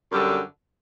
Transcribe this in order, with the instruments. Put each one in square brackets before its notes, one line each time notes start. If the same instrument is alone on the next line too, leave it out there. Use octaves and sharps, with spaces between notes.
[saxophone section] F#2 D3 G3